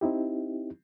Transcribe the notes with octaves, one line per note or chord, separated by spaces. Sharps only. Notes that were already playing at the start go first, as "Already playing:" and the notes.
C4 D#4 E4 G4